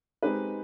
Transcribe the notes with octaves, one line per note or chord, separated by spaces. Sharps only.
G#3 C4 D#4 G4 B4